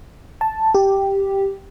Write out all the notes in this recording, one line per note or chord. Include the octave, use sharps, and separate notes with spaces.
A5
G4